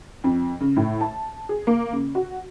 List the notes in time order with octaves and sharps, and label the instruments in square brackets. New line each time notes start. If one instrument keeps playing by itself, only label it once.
[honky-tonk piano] F2
C#3
A2
A5
G#4
A#3
C#3
F#4